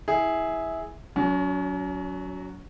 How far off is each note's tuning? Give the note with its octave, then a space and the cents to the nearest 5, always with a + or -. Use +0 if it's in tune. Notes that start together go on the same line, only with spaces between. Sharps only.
E4 -15 G#4 +0
F#3 +0 C#4 +40 F#4 +0